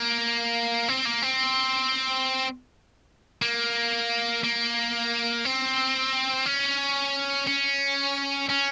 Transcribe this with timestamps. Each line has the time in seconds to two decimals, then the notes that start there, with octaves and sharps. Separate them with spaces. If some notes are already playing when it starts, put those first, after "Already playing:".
Already playing: A#3
0.89 C4
1.05 A#3
1.22 C4
3.42 A#3
4.43 A#3
5.45 C4
6.46 C#4
7.48 C#4
8.49 C#4